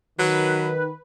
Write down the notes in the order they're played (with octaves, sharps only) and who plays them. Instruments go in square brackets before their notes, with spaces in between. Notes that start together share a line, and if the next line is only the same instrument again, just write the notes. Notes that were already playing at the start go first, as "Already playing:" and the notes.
[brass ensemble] D#3 [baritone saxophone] F#3 [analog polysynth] B4